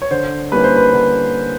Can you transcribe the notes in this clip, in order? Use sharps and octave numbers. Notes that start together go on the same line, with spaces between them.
C#5
D3 C5
G3 A#3 C#4 E4 B4
C5
B4
D3